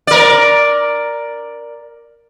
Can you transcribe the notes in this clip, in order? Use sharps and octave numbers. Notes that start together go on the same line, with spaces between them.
A#4 D5